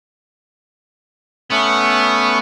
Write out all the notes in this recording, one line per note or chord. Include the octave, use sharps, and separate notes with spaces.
A3 B3 C#4 C#6